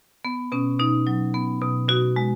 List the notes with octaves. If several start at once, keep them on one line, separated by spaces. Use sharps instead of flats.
B3
B2 C#4
B2 D#4
F#3
B3
B2
B2 F#4
G#3